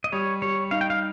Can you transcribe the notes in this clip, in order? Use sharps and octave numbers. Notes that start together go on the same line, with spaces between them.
D#5
G3 C#5
G3 C#5
D#4 F5
G5
F5